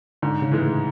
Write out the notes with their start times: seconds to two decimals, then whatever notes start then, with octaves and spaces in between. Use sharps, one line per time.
0.22 G#2 D3
0.42 C#3
0.51 E3 G#3
0.61 A2